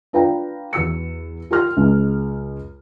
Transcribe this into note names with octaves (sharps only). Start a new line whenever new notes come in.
D4 F4 B4 F5 G5 A#5
E2 F#4 E6 C#7
F4 G4 A#4 C6 F6
C#2 G#3